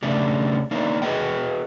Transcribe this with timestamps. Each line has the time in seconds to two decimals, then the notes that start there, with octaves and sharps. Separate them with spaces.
0.03 C#3 A3 C#4 D4 G4
0.71 A#3 D4 D#4
1.02 F#4 G#4 A#4 B4 D#5 G5